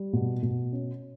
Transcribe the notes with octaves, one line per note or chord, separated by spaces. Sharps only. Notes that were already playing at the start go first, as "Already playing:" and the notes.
Already playing: G3
B2
B2
C#4